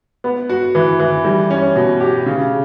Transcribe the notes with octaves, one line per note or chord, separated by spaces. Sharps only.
B3
F#4
E3
E3
G3
C#4
B2
G4
C#3